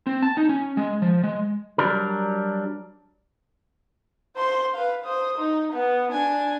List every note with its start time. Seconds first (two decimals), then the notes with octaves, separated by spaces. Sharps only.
0.07 C4
0.23 A5
0.37 D#4
0.49 C#4
0.77 G#3
1.02 F3
1.24 G#3
1.78 F#3 G3 D4 A#4
4.37 C5 C6
4.75 B4 F5
5.06 C5 D#6
5.39 D#4
5.74 B3
6.13 D4 G#5